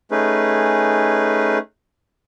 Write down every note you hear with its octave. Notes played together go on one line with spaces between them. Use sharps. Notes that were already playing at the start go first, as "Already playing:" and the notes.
A3 C#4 D#4 G#4 B4